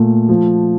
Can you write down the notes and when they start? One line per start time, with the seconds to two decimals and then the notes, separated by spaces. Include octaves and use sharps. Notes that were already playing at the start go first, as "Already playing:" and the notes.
Already playing: A#2 A3
0.29 F3